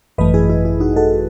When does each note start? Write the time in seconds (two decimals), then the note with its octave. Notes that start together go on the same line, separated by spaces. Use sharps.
0.18 G#1 F#2 E3 A3 B4 D#5
0.34 E4 G#4
0.50 E4
0.65 E4
0.80 D#4 F#4
0.96 F#4 A4